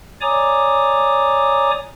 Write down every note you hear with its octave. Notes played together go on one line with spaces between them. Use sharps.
C#5 D5 G#5 A#5 D6 D#6